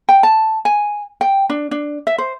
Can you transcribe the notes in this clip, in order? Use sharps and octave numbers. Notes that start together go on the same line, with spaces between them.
G5
A5
G#5
G5
D4
D4
E5
C5